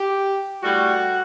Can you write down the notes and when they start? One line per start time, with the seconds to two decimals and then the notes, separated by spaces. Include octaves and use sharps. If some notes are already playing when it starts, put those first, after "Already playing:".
Already playing: G4
0.63 A2 G3 F#4